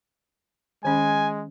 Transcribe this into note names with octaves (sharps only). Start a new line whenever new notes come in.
D#3 G#3 C#4 G#5